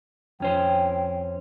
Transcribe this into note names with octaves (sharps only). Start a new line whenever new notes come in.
F2 C#4 C5 G5